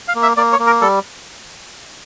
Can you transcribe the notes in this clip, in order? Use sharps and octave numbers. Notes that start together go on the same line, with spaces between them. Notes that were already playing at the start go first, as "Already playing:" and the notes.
F5
A#3
E5
A#3 D5
C#5
A#3
A#4
G3 A4